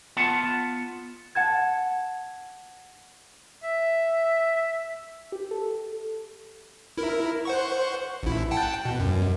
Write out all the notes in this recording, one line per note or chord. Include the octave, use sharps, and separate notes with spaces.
B3 F4 F#5 A5
F#5 A5 G#6
E5
G4
A4
E4 A#4
C5 F#5 C#6
A1 E4
F#5 G5 A5
B2
F#2